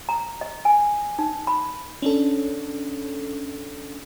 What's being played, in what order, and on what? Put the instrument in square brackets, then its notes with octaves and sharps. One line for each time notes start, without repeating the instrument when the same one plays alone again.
[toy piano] A#5
D#5
G#5
D#4
B5
[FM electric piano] C#4 D4 A4